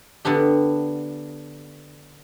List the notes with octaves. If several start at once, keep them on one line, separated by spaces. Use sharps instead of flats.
D3 B3 D4 G4